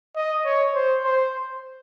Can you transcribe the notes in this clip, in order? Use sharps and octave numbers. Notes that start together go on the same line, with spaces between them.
D#5
C#5
C5
C5